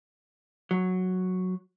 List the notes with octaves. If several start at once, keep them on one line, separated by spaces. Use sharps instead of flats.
F#3